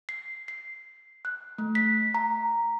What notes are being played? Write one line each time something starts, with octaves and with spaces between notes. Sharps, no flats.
C7
C7
F#6
A3
B6
A#5